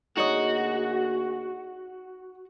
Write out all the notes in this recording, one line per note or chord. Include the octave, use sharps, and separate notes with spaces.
D2 A#3 D#4 F#4 G#4 C#5 D#5